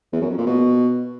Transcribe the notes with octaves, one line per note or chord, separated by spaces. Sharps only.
E2
F#2
F2
A#2
B2